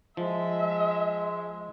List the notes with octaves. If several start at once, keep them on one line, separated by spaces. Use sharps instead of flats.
F3 G#3 E5